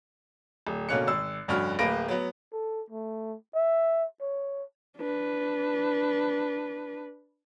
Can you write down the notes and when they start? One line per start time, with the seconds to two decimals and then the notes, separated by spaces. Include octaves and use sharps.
0.67 D1
0.89 B2 D3 A#3 C#4 F#6 C#7
1.07 G#1 E6
1.48 F1 G2 C#4 F#4 C#5 F6
1.79 D1 A#3 B4 A#6 D7
2.08 F#3 B3
2.53 A4
2.91 A3
3.55 E5
4.21 C#5
4.98 D4 B4